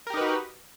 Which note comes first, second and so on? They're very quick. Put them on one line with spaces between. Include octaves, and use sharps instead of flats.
A#4 G4 D#4 B4 F#4